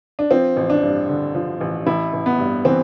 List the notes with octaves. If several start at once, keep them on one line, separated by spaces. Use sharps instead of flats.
D4
F3 C4
A1
D4
G2
D3
F3
A1
A1 E4
A1
B3
G2
E3 C4